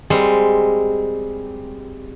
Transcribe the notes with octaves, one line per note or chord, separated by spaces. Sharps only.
G3 G#3 C4 A#4